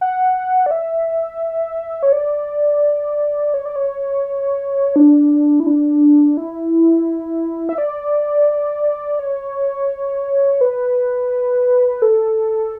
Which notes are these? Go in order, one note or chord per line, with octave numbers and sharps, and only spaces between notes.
F#5
D5
E5
C#5
D5
C#5
D5
C#5
D4
E4
D4
E4
E5
D5
C#5
B4
A4